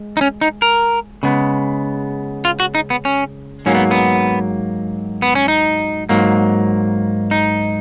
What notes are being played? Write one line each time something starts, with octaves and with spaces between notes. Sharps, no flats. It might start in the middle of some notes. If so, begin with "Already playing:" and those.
Already playing: G#3
D#4
C#4
D#4
A#4
C#3 G#3 B3
F4
F#4
D#4
B3
C#4
G#2 F#3 A#3 C#4
B3
B3
B3
C#4
D#4
G#2 F#3 A#3
D#4